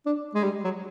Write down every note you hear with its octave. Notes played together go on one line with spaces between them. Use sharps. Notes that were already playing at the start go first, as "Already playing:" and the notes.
D4
G#3
G3
F#3